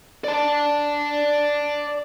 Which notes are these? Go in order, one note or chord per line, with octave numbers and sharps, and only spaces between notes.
D5 A5